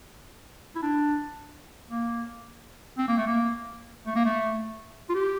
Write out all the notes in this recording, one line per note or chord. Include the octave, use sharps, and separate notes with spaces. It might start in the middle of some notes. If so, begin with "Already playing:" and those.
E4
D4
A#3
C4
A#3
A3
A#3
A3
A#3
A3
F4
G4